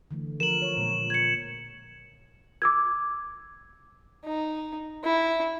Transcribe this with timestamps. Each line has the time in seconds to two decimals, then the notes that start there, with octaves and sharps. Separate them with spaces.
0.11 D3 E3 A3
0.40 F3 A#4 E7 F#7
0.62 C#5
0.77 A#2 G#3 C#5
1.10 G#6 C#7
2.62 D6 E6 G#6
4.25 D#4
5.05 E4